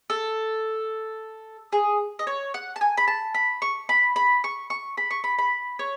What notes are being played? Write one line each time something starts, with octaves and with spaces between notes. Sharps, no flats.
A4
G#4
D#5
C#5
F#5
A5
G#5
B5
A5
B5
C#6
B5
B5
C#6
C#6
B5
C#6
B5
B5
C#5